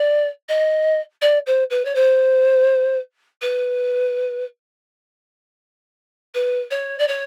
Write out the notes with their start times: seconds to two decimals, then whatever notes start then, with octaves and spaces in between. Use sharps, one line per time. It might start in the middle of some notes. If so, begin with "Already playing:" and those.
Already playing: D5
0.49 D#5
1.21 D5
1.46 C5
1.70 B4
1.85 C#5
1.95 C5
3.42 B4
6.34 B4
6.71 C#5
6.99 D5
7.08 C#5